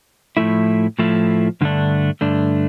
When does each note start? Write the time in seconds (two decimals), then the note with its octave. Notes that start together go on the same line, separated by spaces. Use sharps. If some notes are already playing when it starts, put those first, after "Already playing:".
0.37 A2 F3 A3 E4
0.99 A2 F3 A3 E4
1.61 G2 D3 A3 D4
2.21 G2 D3 A3 D4